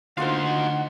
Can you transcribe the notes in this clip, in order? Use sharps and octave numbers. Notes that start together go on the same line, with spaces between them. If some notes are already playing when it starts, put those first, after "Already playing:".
D2 D3 D#4 F4 F#4 C5 F5 F#5